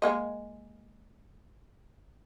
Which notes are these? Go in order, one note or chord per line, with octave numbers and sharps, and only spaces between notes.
G#3 A#3 D#5